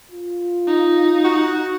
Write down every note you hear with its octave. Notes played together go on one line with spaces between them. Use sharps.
F4
D#4
F#4